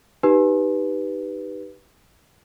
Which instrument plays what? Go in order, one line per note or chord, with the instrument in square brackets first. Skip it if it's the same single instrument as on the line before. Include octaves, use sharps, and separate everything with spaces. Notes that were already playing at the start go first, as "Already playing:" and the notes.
[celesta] D#4 G4 B4